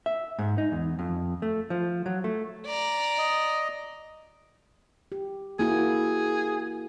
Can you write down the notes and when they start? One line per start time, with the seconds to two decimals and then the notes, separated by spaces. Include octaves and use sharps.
0.06 E5
0.39 G#2
0.58 D#4
0.72 E2
0.99 F2
1.42 A3
1.70 F3
2.06 F#3
2.24 A3
2.66 D5 A#5
3.18 D#5
5.12 G4
5.59 A#3 E4 F#4 G#4